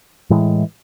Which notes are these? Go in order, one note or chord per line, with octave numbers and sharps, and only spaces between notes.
A2 E3 G#3